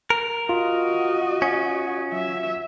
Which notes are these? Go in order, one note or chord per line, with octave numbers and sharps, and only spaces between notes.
A#4
F4 F#4 D#5
C#4
F#3 E5